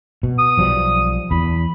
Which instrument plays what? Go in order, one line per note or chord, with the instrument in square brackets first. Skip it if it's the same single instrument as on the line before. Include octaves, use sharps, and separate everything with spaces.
[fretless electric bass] B2
[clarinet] D#6
[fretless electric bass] B1 F3 G3
[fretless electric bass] E2 [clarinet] B5